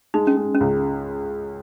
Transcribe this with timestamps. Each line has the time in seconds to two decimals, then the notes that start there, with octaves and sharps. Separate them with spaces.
0.14 G#3 D#4
0.27 C#4
0.37 G#3
0.55 C#4
0.60 C#2